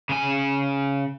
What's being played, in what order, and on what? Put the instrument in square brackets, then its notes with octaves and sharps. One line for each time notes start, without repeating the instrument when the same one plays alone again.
[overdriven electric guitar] C#3 G#5